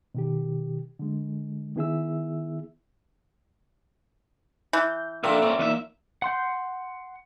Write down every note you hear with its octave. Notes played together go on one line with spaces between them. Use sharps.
B2 D#3 G4
D3 G#3
D#3 B3 E4 G#4 E5 E6
E3 G6
A#2 D4 F4 A4 E5 G5 A#5 E6
A#2 C4 C#4
B1 E3 D#4 E5
F#5 C6 G6